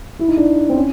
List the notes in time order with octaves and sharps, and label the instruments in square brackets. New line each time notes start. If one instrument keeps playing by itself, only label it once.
[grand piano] E4
D#4
D4
C4
C#4